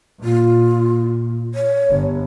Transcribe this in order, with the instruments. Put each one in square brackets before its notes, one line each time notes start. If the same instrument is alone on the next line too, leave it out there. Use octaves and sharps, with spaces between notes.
[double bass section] A#2 [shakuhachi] F4
[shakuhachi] C#5
[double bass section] G1